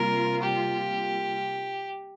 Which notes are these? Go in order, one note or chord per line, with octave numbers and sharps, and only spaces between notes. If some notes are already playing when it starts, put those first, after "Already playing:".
Already playing: C3 G3 A#3 F4 A#4
G4